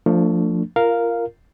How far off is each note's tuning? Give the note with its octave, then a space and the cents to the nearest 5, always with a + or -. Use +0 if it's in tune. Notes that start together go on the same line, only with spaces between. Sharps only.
F3 +0 A3 +35 D4 +0
F4 -25 A#4 -5 F5 +0